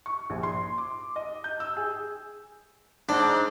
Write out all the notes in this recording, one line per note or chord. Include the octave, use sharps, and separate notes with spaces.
C#6
A#1
C6
D6
D#5
G6
E6
G#4
G#2 D4